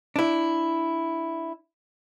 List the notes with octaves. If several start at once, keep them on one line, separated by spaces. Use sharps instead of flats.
D4 E4